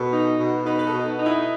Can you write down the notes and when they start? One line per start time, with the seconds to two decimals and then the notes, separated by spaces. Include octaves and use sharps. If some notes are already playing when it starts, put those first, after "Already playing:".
Already playing: B2 A4
0.13 D#4
0.39 B2
0.66 D#4 B4
0.79 B4
0.87 A4
0.93 B2
1.20 D#4
1.26 E4